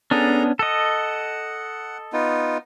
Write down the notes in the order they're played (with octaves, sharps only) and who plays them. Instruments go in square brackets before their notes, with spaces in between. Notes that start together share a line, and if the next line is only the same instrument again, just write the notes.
[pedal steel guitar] B3 C#4 D4 [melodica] G#4 A4 A#5
[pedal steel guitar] A4 D#5 [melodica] F#5
[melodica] B3 D#4 F4